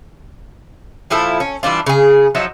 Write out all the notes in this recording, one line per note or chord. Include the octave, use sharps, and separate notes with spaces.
A#2 F3 E4 A4
C#4
E3 G3 D4 F4
C#3 G#4
F3 F#3 D#4 E5